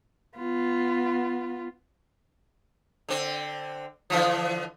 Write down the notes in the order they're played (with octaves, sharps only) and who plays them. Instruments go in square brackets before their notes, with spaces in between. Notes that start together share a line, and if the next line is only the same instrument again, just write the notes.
[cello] B3 F4
[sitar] D3 C4
D3 E3 F3